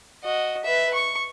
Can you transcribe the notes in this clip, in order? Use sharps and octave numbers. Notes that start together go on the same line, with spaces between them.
F#4 D#5
B4 E5
C#6